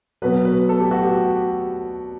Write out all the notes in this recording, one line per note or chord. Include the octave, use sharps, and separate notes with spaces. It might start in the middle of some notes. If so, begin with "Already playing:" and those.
B2 F#3 B4
B4
A4
G4
F#4
G4